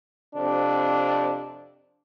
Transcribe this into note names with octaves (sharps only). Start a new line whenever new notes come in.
F2 C3 D4